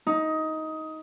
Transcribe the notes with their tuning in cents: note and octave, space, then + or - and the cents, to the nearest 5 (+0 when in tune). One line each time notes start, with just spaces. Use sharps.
D#4 +15